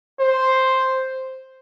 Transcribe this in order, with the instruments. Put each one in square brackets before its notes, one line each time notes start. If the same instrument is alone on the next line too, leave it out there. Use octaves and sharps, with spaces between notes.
[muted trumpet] C5